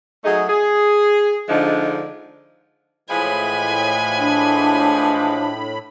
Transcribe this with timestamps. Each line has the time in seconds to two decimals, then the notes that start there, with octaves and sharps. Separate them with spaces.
0.24 F#3 A3 D#4 G#4
0.49 G#4
1.49 D3 F3 G#3 D4 D#4
3.10 A2 E3 F3 G#3 G#5 B5
4.19 D4